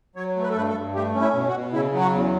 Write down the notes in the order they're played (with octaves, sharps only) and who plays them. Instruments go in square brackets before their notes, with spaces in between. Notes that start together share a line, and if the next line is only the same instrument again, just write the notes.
[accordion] F#3 C#5
A3
B4
A4
G2 B4
A4
G2
A3 G4
C#4
E4
B2
F#4
B2
C#3 E4
F#3
F#4
E2